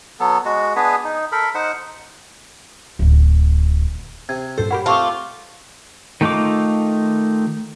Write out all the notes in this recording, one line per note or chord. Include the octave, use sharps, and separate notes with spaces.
F#3 B3 A4
G#3 F#4
B3 D4 G#4 B4
D#4
A4 A#4 B5
D#4 C5 F#5
D1 D2
C3 G#6
G2 A#2 A4 C5
G4 A#4 C#5 F#5 B5
A3 C4 F4 A5 C#6 D6
D#3 A3 D#4 F4 D6